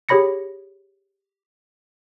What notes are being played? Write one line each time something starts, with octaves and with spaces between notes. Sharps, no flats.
G4 G#4 C#5 B5 A#6 C#7